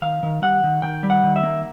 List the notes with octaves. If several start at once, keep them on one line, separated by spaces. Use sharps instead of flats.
D#3 F5
D#3
G3 F#5
D#3
D#3 G5
G3
F#5
D#3
E5
A#3